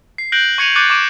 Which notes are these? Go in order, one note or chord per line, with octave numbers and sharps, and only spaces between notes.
C7
F#6 G6 A#6 D7 F#7
C#6 G#6 C#7 D#7 F7 F#7
C#6 D6 F#6 G6 A6 C#7
C#6 D6 D7 E7